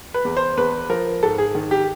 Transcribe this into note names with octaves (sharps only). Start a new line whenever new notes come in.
B4
E2
C5
E2 B4
F3 A#4
G#2 A4
G#4
D#3
G4